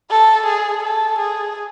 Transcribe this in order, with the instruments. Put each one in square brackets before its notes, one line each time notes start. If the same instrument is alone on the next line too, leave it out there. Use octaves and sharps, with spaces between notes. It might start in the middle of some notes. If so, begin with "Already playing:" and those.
[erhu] A4
G#4
A4
G#4